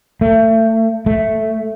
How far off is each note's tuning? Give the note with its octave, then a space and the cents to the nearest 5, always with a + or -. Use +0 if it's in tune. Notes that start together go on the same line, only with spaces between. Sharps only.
A3 +30
A3 +0